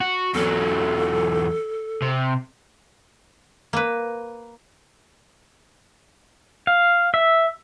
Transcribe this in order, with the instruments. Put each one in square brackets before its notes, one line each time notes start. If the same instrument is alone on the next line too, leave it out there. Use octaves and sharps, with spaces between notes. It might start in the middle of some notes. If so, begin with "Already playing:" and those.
[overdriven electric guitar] F#4
[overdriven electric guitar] E2 F#3 [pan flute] A4
[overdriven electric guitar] C3
[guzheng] A#3 B4
[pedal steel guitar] F5
E5